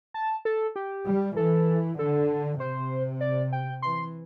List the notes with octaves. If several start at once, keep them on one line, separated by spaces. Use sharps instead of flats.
A5
A4
G4
G3
E3 A4
D3 A4
C3 C5
D5
G5
E3 C6